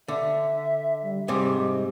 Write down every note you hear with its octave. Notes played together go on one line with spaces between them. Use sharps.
D3 E5
G3
G#2 C3 G3 G#3